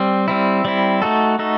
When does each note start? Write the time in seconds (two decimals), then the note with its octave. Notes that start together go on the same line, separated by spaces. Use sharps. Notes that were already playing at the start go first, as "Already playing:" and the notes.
Already playing: G3 C4
0.28 G3 C4 E4
0.65 G3 C4 E4
1.02 A3 D#4 F#4 A4
1.39 A3 D#4 F#4 A4